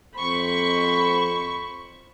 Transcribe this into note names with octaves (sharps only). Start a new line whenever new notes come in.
F2 C5 B5 C#6